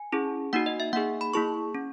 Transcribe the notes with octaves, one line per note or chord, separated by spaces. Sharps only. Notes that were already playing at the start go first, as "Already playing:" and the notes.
Already playing: G#5
C#4 E4 G#4
A#3 D#4 F#4 F#5
D#5
E5
A#3 D#4 G#4 F#5
B5
A#3 E4 G#4 C#6
C#4